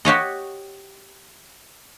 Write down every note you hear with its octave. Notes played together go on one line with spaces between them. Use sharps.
F#4 G4 C#5 D#5